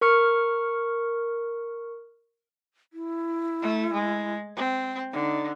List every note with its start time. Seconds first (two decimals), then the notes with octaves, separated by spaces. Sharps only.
0.01 A#4 C#6 F6 C#7
2.93 E4
3.62 A3
3.93 G#3
4.56 C4
5.13 D3 D#4